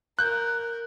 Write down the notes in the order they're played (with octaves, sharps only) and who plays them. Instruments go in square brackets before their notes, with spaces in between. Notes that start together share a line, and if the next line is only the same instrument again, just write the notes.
[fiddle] A#4 [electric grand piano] F#6 G6